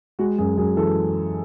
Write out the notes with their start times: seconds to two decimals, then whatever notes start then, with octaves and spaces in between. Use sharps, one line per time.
0.19 G#3 F#4
0.38 F#2 G#4
0.57 F#2 G#4
0.77 E3 A4